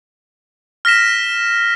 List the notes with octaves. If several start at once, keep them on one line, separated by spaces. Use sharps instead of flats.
F6 A#6 B6 E7